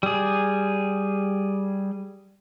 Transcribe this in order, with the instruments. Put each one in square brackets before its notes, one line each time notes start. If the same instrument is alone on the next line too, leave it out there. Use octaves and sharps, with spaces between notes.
[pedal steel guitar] G3 G#4